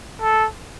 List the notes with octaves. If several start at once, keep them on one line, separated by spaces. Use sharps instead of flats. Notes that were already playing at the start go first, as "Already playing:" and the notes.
A4